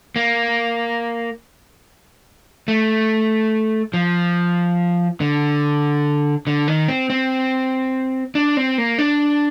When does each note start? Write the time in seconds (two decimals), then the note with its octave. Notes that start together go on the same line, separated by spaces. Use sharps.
0.16 A#3
2.68 A3
3.94 F3
5.20 D3
6.47 D3
6.68 D#3
6.88 C4
7.10 C4
8.35 D4
8.57 C4
8.78 A#3
8.98 D4